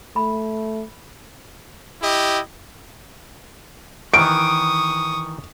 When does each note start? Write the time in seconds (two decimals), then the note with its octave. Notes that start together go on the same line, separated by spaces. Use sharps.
0.16 A3 B5
2.02 E4 G4 D#5
4.14 D#3 E3 C#6 D#6 D7